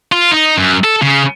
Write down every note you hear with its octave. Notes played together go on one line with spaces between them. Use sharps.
F4
D#4
F#2
A4
C#3